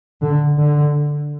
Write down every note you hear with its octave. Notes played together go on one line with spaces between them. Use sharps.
D3
D3